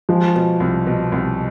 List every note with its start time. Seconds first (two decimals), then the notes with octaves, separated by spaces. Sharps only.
0.09 F3 G#3
0.35 B2
0.60 C2
0.86 B2
1.12 C2